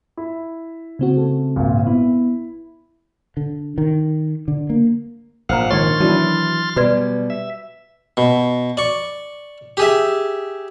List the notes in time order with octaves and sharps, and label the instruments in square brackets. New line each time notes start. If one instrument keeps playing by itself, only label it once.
[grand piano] E4
[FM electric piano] C#3 C4 F#4
[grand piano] A3
G#1 A#2
[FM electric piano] B3 [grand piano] E4
[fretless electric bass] D3
D#3
D3
A#3
[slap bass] A#1 G#2 [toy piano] A#4 C5 A#5 [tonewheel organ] F5 F#5
[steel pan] D#3 G#3 C#5 [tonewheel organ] C6 F6 A6
[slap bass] E3 [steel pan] F#3 D4 E4
[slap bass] B2 G3 [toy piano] F#4 B4 D5
[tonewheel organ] E5
[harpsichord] B2
D5 C#6
G4 G#4 E5